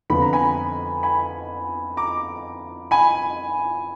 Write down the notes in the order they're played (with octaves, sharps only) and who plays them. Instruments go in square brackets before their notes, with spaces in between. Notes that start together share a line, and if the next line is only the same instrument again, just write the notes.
[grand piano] F2 D3 F3 B3 B5
A#5
G#5 B5
G#5 B5
A#5 D6
G#5 B5